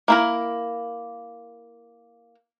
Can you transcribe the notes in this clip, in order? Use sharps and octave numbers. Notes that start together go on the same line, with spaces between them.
A#3 E4 A#4